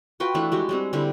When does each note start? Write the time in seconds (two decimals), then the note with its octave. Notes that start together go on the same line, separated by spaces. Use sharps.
0.20 F4 F#4 B4 G5
0.35 E3 A3 D4 A4
0.52 G#3 F#4 G4
0.69 G3 G#3 C4
0.93 D3 G3 C4 E4